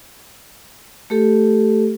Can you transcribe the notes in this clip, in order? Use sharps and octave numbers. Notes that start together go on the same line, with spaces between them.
A3 G4 A4